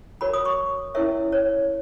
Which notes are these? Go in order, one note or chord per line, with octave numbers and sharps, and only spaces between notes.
F#4 A#4 C#5 B5
D#6
C#6
C#4 E4 A#4 C#5 E5
C#5